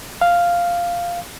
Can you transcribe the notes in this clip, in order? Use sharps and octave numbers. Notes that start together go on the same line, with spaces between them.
F5